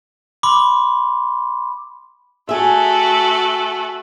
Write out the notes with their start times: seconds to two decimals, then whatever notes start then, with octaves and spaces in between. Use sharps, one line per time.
0.43 B5 C6 D6
2.49 A3 F#4 G#4 E5